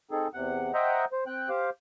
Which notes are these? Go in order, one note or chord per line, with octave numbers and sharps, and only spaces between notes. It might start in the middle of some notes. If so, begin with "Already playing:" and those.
C4 D#4 G#4 A4
E2 C3 F#5
C5 D#5 E5 F#5 G5 A#5
C5
C4 G5 F#6
G4 C5 F5 D6